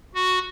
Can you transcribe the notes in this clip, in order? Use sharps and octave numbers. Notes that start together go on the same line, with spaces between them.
F#4